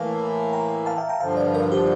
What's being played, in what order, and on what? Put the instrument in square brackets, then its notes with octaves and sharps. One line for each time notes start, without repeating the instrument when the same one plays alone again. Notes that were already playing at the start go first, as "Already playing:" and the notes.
Already playing: [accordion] A2 E3 A#3 [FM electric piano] F5 A5
[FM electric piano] G5 A#5
F5 A5
E5 G5
G5 A#5
[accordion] G2 D3 F3 [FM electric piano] F5 A5
[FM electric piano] D5 F5
A#4 D5
G4